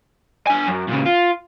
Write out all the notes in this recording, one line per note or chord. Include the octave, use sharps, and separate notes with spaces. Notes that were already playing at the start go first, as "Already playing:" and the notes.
D4 G#5
F#2
A#2 C#3
F4